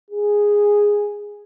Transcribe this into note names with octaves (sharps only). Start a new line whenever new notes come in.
G#4